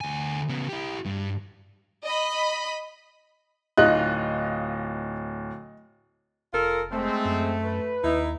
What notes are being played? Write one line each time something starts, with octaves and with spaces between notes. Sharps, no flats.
D2 G#5
C#3 B3
E4 G4
G2
D#5 B5
D1 D#4 F4 D#5 F#6
F1 F4 A4 A#4
G#3 A3 C4
F#2
B4
D#2 D#4 E4